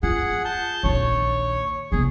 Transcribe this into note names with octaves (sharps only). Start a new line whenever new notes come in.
F4 G#4 F#5
A5 G6
A#1 D#2 C#5
C2 B3 G#4